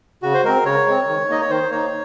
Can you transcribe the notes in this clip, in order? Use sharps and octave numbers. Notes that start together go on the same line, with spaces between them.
C#3 F#4
C5
G#3 C4 A#4
C#3 C#5
G#3 C4
D#3
A#3 D#4 D#5
C#5
D#3 C5
A#3 D#4 C#5